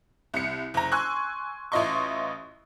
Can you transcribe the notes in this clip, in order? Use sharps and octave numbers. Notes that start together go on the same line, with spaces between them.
C2 C#7
F#1 A#5
G#5 C6 C#6 E6 F#6
A1 E4 F4 D#5 C6 C#6